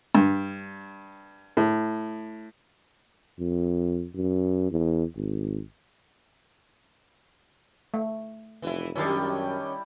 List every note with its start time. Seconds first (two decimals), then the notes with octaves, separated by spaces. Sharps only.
0.15 G2
1.57 A2
3.40 F2
4.15 F#2
4.71 E2
5.16 G#1
7.94 A3
8.62 F1 E3 E4
8.95 F#2 D#3 G3 C#4 D4 E4